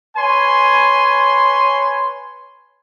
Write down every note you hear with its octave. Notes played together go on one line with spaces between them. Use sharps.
B4 C#5 G#5 B5 C6